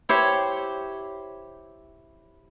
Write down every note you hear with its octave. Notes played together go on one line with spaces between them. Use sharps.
E4 G4 C5 C#5